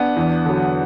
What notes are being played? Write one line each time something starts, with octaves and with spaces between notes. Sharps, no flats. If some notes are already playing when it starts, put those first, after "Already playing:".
Already playing: B3 D4
E2
D3 F#3